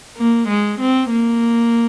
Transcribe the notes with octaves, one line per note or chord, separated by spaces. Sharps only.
A#3
G#3
C4
A#3